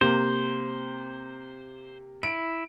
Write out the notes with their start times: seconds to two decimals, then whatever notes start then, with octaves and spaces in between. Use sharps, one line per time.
0.01 C3 A#3 C5
2.23 E4 D7